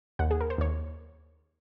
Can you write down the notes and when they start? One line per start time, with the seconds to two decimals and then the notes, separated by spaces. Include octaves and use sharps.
0.19 D#2 F#5
0.31 G#4
0.41 A#4
0.50 C5
0.58 D#2 C#5